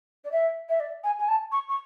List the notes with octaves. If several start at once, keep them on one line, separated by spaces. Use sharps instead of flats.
D5
E5
E5
D5
G#5
G#5
A5
C#6
C#6